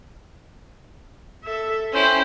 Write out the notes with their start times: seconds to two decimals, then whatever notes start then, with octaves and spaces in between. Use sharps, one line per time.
1.44 A4 E5
1.93 C#4 E4 C5 G5